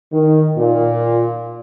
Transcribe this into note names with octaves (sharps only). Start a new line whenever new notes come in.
D#3
A#2